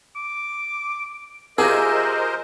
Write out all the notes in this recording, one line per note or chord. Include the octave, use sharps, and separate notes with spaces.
D6
F4 G4 G#4 A#4 C5 D#5 E5 G#5